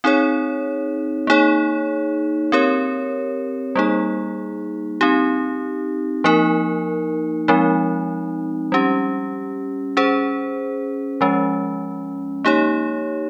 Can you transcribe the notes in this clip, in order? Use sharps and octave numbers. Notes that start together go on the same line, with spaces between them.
C4 D#4 G#4 C#5
A#3 D#4 G#4 C#5
C4 G4 A#4 C#5
G3 A#3 D#4 G#4
C4 D#4 G4
F3 A#3 D#4 A#4
F3 G#3 C4 D#4
G3 C#4 G4
C#4 G#4 C5
F3 G#3 C#4
A#3 D#4 G4 C#5